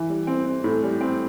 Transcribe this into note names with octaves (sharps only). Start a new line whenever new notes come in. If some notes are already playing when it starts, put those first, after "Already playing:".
Already playing: E3
G3
C4
C4
A2
G3
C4